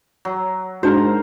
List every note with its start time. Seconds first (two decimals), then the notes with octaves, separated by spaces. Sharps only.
0.25 F#3
0.83 G#2 D4 F#4 A#4 C5